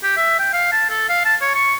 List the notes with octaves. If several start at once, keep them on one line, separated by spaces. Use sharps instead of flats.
G4
E5
G5
F5
A5
A4
F5
A5
C#5
C#6